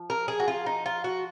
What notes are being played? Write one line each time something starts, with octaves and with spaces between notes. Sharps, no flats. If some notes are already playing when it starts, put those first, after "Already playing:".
Already playing: F3
A#4
G#4
F#4
F4
D#4
F4
F#4